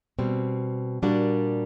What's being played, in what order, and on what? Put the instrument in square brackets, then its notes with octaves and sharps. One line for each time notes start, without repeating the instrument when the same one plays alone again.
[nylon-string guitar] B2 G3 C4
A#2 G3 A#3 D4 F#4